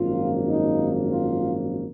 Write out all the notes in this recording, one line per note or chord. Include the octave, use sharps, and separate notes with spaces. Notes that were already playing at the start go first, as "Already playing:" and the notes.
Already playing: G#1 F#2 F3 A#3 F4
D#4
F4